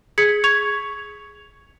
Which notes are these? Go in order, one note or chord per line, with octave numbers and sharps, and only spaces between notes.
G#4 G#6 B6 C#7
C#6 G#6 F7